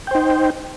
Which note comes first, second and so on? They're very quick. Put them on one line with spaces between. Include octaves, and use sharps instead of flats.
G5 C5 D#4